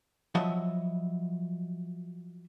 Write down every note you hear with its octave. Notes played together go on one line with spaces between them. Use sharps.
F3 F#3 D#5 E5